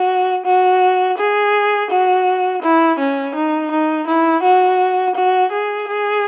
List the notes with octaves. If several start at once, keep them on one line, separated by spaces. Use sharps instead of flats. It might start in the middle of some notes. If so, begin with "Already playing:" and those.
Already playing: F#4
F#4
G#4
F#4
E4
C#4
D#4
D#4
E4
F#4
F#4
G#4
G#4